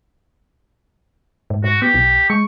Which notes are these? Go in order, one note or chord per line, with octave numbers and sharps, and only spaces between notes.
G#2
G#2 F#4
B3 G4
B1
G#3 C#6